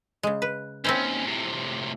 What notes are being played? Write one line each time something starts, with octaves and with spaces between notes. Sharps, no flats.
C#3 G#3
B4
D#2 C4 C#4 E4 C5
A2 C3